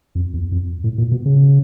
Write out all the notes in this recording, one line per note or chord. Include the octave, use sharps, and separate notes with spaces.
F2
E2
F2
A2
A#2
B2
C#3